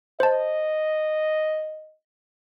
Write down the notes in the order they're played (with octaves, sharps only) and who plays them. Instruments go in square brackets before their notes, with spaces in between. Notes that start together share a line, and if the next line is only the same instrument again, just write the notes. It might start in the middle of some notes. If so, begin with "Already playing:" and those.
[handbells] C5 A5 [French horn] D#5